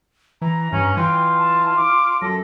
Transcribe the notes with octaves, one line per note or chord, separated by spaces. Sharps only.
E3 A#5
G2 C#4
E3 F4 G5
A5
D6
F#2 A4 A#6